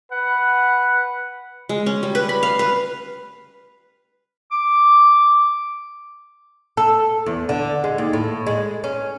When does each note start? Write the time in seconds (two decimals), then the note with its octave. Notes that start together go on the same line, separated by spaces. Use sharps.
0.12 B4 F#5
1.69 G#3
1.86 C#4
2.03 G3
2.15 B4
2.29 B5
2.43 F5
2.59 B4
4.51 D6
6.77 A4
7.26 E2
7.49 D3
7.84 G#3
7.98 D#2
8.13 A2
8.47 G#3
8.84 C#4